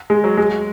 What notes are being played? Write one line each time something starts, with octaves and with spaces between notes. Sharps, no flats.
G#3
F#3
G#3